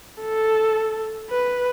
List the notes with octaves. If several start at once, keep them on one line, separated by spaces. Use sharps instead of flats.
A4
B4